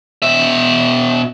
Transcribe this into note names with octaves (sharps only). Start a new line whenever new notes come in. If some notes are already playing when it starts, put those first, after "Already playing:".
B2 E5